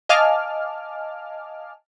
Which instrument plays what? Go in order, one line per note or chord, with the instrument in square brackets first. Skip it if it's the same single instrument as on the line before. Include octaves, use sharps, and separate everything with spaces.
[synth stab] D#5 F5 G#5 A5 D6 F6